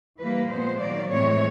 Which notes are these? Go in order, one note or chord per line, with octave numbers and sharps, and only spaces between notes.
E3 G3 A#3 B4
A#2 F3 G#3 B3 C5
D#3 F#3 A#3 D5
A2 E3 G#3 C4 C#5